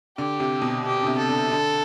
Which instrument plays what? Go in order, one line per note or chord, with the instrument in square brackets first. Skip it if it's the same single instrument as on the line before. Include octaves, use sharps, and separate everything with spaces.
[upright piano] D3 [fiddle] G4
[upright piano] C3
B2
[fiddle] G4
[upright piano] D3
C3
[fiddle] A4
[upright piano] D3
D3